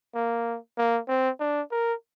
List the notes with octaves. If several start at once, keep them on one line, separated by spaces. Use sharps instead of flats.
A#3
A#3
C4
D4
A#4